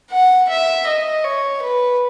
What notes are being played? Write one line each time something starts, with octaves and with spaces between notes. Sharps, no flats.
F#5
E5
D#5
C#5
B4